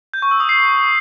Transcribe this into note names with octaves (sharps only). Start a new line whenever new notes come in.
G6
C#6
E6
D#6
C7